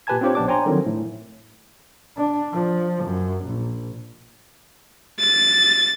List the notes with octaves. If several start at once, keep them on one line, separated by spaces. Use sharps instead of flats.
A#2 G4 B4 G#5 A5 G#6
C4 D4 F4 G4 C5 C#5
A#1 B3 D4 D6
C5 C#5 G5 G#5 A#5 C6
D3 D#3 F3 F#3 C4
A2
D4
F3
F#2
A#1
A6